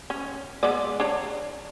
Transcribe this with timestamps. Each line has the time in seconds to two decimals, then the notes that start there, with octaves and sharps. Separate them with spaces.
0.10 C#4
0.63 G#3 B3 D5
1.00 D4 C#5 A#5